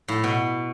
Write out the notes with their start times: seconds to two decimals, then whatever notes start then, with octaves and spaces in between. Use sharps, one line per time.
0.08 A2
0.24 B2